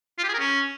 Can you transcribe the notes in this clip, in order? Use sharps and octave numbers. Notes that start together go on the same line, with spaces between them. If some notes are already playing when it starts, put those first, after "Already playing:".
F4
G4
G#4
A#4
C#4